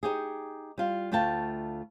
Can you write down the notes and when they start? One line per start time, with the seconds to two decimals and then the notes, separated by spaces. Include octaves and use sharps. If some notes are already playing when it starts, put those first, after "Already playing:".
0.03 D#4 G4 G#4
0.78 G3 F4
1.12 D2 A3 F4 G5 A5